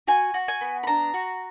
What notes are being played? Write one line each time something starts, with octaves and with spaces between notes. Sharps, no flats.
F#4 G#5
F#4
G#5
B3
B5
D4 A#5
F#4